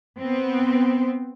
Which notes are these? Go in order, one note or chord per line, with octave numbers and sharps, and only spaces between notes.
B3 C4